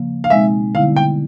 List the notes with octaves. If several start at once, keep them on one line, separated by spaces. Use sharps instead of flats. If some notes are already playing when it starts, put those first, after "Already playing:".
Already playing: C#3 F3 A#3
F5
B2 G#3 C4 D#4 E5
D3 G3 B3 E4 F5
G5